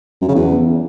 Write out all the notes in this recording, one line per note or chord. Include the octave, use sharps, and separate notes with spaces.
F#2
C#3
E2